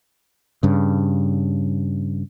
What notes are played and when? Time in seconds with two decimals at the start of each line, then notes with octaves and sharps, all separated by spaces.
0.63 G2 C#3